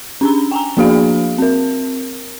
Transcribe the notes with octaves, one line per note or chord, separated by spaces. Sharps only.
C#4 D4 A#5
G5 G#5 A#5
F3 A#3 D4 F#4 G#4 F5
C4 A#4